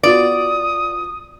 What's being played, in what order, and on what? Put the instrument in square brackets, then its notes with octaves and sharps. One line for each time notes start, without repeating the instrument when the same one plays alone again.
[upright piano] B3 F4 F#4 [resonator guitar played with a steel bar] D5 [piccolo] D#6